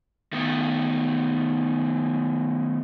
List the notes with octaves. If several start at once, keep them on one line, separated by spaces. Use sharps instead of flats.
D#3 A3 B3